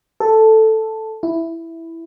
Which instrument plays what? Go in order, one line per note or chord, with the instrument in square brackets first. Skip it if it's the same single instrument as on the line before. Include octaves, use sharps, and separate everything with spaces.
[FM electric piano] A4
E4